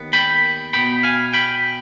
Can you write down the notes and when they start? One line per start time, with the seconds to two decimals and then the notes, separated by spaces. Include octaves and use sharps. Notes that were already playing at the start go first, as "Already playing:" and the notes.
Already playing: D#2 D#3 B3
0.13 G5 B5
0.73 B2 B3 G5 B5
1.03 F5 G#5
1.33 G5 B5